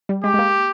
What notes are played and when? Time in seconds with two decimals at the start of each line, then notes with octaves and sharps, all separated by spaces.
0.09 G3
0.24 G#3 G4
0.34 G#3
0.39 A#3